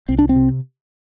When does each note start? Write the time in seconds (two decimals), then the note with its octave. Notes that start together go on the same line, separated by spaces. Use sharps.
0.09 C2 C4
0.19 D4
0.29 C4
0.36 C3